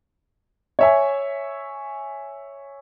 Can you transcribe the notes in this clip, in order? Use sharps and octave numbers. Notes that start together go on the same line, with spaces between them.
C#5 E5 G#5